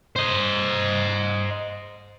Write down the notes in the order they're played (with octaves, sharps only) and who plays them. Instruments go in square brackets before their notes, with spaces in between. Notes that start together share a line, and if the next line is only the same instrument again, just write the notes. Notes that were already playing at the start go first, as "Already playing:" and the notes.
[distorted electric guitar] C5 D#5